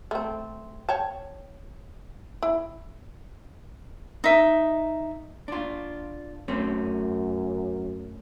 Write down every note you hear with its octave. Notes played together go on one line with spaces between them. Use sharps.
A3 C4
C#5 G5 A5
E4
D#4 E5
D4 F4
F#2 A3 C4 C#4